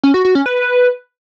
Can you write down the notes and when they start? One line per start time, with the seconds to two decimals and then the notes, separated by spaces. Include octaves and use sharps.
0.03 C#4
0.14 F#4
0.25 F#4
0.35 C#4
0.46 B4